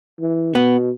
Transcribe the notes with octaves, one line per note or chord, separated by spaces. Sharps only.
E3
B2 B3